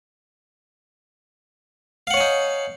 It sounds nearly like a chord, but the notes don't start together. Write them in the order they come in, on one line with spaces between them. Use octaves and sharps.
F5 F#5 C#5 G#5 D#4